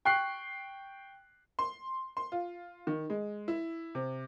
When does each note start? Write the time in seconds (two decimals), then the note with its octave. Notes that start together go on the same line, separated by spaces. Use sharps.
0.05 G5 C#6 F#6 C7
1.59 C6
2.17 C6
2.32 F4
2.87 D#3
3.10 G#3
3.48 E4
3.95 C3